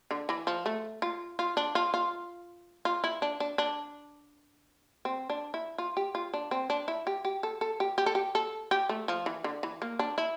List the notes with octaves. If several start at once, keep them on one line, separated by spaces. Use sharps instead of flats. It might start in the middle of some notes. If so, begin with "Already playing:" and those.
D3
E3
F3
A3
F4
F4
D4
F4
F4
F4
E4
D4
D4
D4
C4
D4
E4
F4
G4
F4
D4
C4
D4
E4
G4
G4
A4
A4
G4
G4
A4
G4
A4
G4
A3
F3
E3
D3
E3
A#3
D4
E4